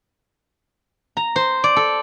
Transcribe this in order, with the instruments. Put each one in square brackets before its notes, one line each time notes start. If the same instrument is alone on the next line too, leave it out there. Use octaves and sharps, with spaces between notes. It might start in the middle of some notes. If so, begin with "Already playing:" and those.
[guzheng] A#5
C5
D5
A4